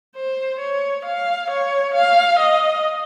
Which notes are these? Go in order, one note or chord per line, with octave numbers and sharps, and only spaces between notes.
C5
C#5
F5
C#5
F5
D#5